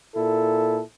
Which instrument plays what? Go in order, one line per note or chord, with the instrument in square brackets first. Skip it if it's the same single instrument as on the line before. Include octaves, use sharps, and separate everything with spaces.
[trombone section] A#2 E4 A4